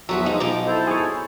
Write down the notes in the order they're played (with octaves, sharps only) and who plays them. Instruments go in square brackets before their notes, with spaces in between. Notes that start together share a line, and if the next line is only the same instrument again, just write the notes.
[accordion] E2 F3 E5 [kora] F#3 [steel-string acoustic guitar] B3 F#4 B4
[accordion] F3 G#3 [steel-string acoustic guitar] D#4
[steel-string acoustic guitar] B2 D#4 A#5 [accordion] F3 D6
[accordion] E4 A4 C5
[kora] G#4 C#5